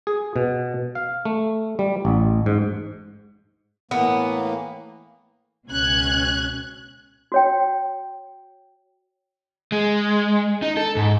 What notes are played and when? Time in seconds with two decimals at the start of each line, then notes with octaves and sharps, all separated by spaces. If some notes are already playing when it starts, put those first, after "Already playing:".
0.07 G#4
0.36 B2
0.95 F5
1.25 A3
1.79 G3
2.05 A1
2.46 G#2
3.91 A2 E3 A#3 B3
5.69 C#2 B2 C#4 F#6 G#6
7.32 F#4 C#5 G5
9.72 G#3
10.62 D#4
10.77 A4
10.96 G#2